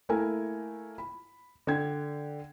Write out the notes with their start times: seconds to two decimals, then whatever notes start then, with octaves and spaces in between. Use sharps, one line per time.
0.09 A3 A#3 E4 A#4 G#5
0.98 B5
1.67 D3 G5 G#6